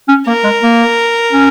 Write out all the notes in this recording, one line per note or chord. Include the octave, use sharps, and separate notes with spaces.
C#4
A#3 A#4
G#3
A#3
C#4